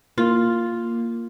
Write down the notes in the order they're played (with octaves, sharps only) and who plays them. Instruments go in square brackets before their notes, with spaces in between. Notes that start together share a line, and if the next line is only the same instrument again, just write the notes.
[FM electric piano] A#3 [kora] F4